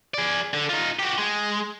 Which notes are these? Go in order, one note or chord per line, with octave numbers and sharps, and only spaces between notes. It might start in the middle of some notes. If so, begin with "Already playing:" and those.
G#4 D5
D3
D#4 F4
F#4 G4
G#3